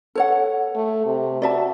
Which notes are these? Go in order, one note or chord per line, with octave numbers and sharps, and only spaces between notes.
A4 C#5 F#5
A3
C3
F#4 D5 E5 A5